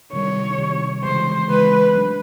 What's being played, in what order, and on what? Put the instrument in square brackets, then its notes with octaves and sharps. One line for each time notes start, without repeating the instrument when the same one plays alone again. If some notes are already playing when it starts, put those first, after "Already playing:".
[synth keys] C3 D#3 G3 [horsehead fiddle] C#5
[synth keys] C3 D#3 G3
[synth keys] C#3 E3 G#3 [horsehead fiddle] C5
[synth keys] C#3 E3 G#3 [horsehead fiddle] B4
[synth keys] F#3 A3 D4